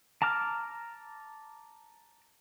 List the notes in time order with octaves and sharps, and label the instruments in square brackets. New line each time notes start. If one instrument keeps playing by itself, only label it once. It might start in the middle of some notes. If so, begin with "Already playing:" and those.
[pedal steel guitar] A5 A#5 D6 F6